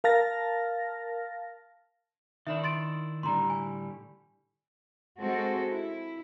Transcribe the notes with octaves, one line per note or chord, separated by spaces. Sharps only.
A#4 F5 A5 F6 A6 A#6
D#3 D4 E4 E5
C6 A6 D7
A2 D3 G3 A#5 C6
G#5
G#3 C4 F#4 A4
E4